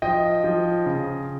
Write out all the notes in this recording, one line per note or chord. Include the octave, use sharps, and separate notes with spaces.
F3 D#5 G5
F3
C#3